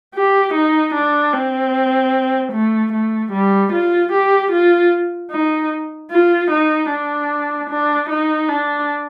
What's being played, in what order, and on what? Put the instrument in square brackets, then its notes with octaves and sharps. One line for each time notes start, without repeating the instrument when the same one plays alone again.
[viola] G4
D#4
D4
C4
A3
A3
G3
F4
G4
F4
D#4
F4
D#4
D4
D4
D#4
D4